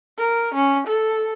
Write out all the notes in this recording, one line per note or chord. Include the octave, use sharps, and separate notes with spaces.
A#4
C#4
A4